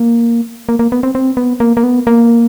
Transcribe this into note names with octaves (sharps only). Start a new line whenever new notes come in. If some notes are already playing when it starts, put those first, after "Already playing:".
Already playing: A#3
A#3
A#3
B3
C4
C4
B3
A#3
A#3
B3
A#3